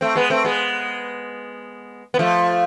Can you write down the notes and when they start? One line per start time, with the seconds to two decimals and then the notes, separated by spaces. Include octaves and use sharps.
0.01 A3 C4
0.15 G#3 B3
0.30 A3 C4
0.45 G#3 B3
2.14 B3
2.19 F3 A3